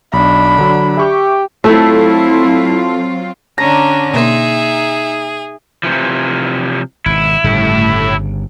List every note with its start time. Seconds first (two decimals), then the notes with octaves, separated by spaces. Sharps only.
0.13 B1 D4 B5
0.58 D3 F#3
0.97 G4 E5 C#6 D6
1.64 F#3 A3 C4 E4 F4 A4
3.58 D3 C#4 D4 A#5
4.14 B2 A#3 D#4 G#4 E5 C6
5.83 C3 E3 F3
7.06 G#1 B2 E4
7.44 G1 A2 C#3 G3